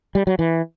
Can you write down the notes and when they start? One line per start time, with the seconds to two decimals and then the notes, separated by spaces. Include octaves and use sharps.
0.15 G3
0.27 F#3
0.39 E3